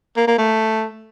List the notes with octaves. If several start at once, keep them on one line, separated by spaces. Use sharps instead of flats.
A#3
A#3
A3